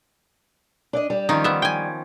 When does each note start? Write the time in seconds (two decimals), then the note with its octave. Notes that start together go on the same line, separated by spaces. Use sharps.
0.93 D4 D5 D#5
1.10 G3 G4
1.29 D#3 F3 C#4 D#4
1.44 B3 E5
1.62 G5 G#5